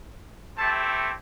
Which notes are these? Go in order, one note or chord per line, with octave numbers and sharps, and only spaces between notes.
A3 C4 E4 G4 A5